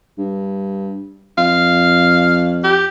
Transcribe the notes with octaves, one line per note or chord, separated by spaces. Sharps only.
G2
F2 F5
G4